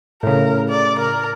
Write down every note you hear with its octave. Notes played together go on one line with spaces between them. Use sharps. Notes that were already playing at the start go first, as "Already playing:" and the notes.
A2 C#3 A#4
D5
A#4